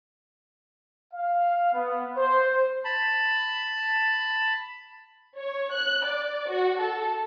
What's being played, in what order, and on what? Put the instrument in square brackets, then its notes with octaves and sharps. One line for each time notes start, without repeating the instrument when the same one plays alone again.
[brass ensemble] F5
B3
C5
[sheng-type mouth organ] A5 B5
[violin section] C#5
F#6
D5
F#4
A4